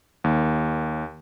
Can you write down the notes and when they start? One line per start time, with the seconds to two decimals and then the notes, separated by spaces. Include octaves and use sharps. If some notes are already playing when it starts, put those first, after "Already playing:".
0.24 D#2